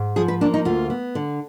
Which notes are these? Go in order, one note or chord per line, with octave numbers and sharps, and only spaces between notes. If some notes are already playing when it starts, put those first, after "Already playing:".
Already playing: G#2
F3 G#4
B4
A#3 D4
D#4
D2 F4
B3
D3